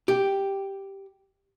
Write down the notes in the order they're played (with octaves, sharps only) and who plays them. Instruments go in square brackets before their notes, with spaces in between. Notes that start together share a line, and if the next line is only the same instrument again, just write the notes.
[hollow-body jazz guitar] G4